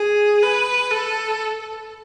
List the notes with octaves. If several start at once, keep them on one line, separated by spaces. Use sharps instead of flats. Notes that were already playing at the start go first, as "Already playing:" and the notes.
Already playing: G#4
B4
A4